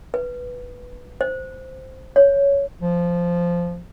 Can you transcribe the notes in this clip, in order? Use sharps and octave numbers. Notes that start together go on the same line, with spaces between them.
B4
C5
C#5
F3